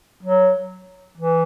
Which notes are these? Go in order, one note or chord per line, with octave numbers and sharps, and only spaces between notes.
F#3
E3